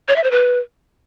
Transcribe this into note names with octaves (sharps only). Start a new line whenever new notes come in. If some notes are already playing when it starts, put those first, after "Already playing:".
C#5
E5
C5
B4